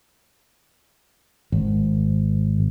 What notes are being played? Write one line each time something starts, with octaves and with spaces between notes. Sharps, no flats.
G#1